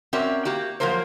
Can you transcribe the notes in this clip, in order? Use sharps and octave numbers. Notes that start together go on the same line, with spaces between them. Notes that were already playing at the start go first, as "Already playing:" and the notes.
C4 C#4 F#4 A#4 D5 E5
A#3 F#4 G4
F3 F#3 A#3 A#4 C5